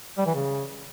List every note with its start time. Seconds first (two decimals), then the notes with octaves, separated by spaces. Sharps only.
0.17 G3
0.26 E3
0.35 C#3